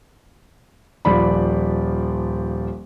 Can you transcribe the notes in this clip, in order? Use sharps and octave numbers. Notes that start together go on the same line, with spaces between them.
D#1 F3 D5 B5